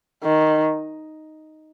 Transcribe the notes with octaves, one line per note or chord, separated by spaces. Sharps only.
D#3